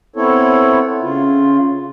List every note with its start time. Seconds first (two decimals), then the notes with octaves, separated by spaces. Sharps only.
0.16 B3 C4 E4 A4 C#5
1.02 C#3 F4